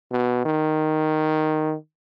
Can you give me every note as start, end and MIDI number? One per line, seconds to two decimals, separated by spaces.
0.12 0.43 47
0.46 1.75 51